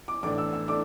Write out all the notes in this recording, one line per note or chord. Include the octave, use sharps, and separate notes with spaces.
D6
A1 A2 A3 D4 D6
E6
E6
A3 D4 D6